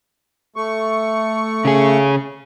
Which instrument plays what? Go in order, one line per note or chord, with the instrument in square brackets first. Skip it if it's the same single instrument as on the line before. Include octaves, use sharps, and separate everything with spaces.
[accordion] A3 C#6
[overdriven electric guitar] C#3 G#4